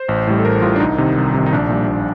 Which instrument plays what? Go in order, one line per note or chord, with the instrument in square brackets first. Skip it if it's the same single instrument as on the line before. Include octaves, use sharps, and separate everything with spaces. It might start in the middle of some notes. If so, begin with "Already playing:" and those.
Already playing: [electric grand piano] C5
A1
A2 G3
A4
A1 A#4
A2 G3 F4
D4
C2 D#4
C3 D#3
C2
C3 D#3
D#4
A#1 D4
A#2 G3
A#1